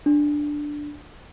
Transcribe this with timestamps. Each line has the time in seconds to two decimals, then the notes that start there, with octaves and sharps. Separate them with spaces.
0.06 D4